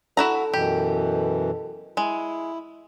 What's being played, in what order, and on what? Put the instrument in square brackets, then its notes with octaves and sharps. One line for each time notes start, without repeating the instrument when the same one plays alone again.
[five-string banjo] E4 F#4 A#5 [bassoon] A4
[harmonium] F#2 B2 E3 [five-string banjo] G4
[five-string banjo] G#3 [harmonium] E4